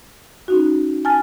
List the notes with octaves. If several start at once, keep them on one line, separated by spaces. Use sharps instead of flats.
C#4 D#4 F#4
G#5 A5 F6 A6